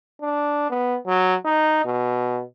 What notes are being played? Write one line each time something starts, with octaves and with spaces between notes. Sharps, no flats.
D4
B3
F#3
D#4
B2